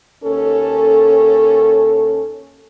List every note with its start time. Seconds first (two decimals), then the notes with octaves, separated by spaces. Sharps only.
0.24 D#2 C#4 A4